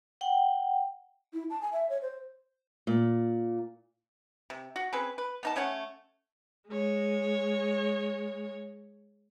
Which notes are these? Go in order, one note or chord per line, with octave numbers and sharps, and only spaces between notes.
F#5 G5
E4
A5
G#5
E5
C#5
C5
A#2
C3
F#4
C4 C#4 G#4 B4
B4
B3 D#4 A5
A3 C#4 C#5 F#5
G#3 C#5